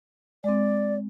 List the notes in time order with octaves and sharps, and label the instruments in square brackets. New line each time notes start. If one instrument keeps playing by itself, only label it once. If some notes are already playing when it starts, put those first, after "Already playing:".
[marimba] G#3 C4 [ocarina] D5